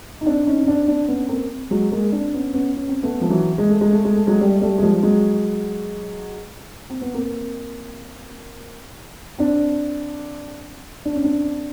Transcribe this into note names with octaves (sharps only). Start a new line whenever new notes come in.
D#4
C4 D4
C#4 D#4
C#4
C4 D4
C4 D4
B3 C#4
A#3 C4
F#3 G#3
G#3 A#3
C4 D4
B3 C#4
B3 C#4
C#4
C4
A3 B3
F3
E3 F#3
G#3
A3
G#3
A3
G#3
A3
F#3 G#3
G3 A3
G3 A3
G#3
F3 G3
F#3 G#3
C4
B3
A#3 C4
C4 D4
D4
C#4
C4 D4